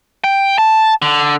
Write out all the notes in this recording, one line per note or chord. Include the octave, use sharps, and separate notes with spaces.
G5
A5
D3